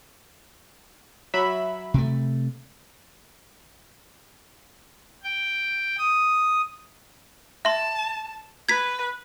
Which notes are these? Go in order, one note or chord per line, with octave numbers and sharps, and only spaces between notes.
F#3 E5 B5
C3 A3
G5
D#6
E5 A5 C6
B4 G#6 B6